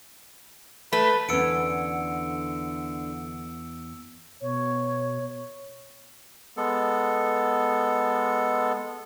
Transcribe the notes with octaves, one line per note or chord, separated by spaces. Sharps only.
A3 B4
E2 D3 C#4 E6 C#7 D7
B2 C#5
G#3 B3 A4